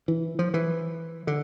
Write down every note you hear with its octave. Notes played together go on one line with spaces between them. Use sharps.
E3
F3
E3
D3